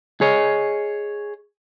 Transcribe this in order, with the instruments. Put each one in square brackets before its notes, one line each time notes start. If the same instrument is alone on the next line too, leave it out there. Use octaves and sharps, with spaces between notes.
[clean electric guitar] G#4 C#5 D#5